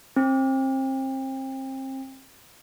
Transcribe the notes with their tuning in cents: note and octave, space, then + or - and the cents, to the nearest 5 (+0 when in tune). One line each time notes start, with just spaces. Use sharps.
C4 +30